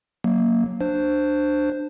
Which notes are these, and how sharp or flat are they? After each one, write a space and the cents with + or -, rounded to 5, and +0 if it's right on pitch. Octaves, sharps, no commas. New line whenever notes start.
F#3 +0 A#3 +0
D4 +15 C5 +0